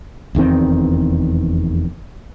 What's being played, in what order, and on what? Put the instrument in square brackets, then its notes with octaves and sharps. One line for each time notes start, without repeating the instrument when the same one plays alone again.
[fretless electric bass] F1 E2 D#3 C4